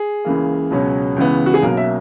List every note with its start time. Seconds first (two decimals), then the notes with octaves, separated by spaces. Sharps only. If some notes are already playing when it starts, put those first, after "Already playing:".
Already playing: G#4
0.25 C#2 C#3 E3 A#3
0.71 C#2 B2 F#3 C#4
1.16 C#2 C#3 E3 B3
1.46 F#4
1.54 G#4
1.62 B1 B2 F#3 A#3 C#4 A#4
1.77 E5